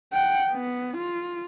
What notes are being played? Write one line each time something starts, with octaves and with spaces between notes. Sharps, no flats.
F#5 G5
B3
F4